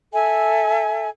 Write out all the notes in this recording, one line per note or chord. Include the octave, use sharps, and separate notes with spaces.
A4 E5 G#5